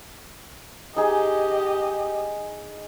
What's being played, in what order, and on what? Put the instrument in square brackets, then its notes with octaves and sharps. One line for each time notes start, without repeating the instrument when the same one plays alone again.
[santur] D#4 G#4 [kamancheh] G4 D#5